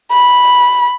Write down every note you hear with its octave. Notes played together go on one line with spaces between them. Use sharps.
B5